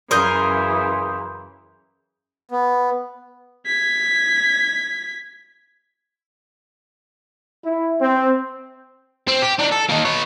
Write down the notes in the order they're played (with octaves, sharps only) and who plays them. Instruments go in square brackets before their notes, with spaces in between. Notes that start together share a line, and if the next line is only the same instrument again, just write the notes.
[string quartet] F#2 C#3 E3 [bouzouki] A#4 F5 [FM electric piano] C6 D#6 G6
[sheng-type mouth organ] B3
[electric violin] G#6 B6
[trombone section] E4
C4
[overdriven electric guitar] C4
G4
D4 D#4
A4
A#3 D#4
B4 C#5